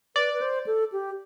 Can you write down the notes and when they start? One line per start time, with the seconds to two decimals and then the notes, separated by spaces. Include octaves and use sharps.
0.16 B4 D5
0.34 B4
0.41 C5
0.67 A4
0.92 G4